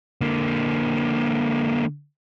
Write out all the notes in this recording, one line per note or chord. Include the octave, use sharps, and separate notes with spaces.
D3 A#3